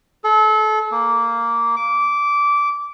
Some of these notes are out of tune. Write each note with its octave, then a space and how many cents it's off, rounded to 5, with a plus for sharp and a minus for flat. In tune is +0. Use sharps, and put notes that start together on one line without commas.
A4 -30
A#3 -5
D6 -15